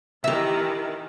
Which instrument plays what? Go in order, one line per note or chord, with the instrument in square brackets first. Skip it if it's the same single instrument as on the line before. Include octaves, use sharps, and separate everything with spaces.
[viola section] D#3 E3 [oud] G4 E5